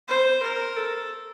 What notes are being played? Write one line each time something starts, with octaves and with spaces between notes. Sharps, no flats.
C5
A#4
A4